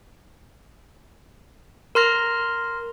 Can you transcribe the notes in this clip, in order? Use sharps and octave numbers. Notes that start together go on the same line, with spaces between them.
A#4 C6 F6 A#6